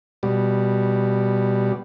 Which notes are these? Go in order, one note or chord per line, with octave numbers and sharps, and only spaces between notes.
B2 G3